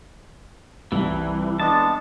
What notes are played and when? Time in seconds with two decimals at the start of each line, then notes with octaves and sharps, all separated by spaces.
0.92 C2 E3
1.60 G#3 B3 D4 A5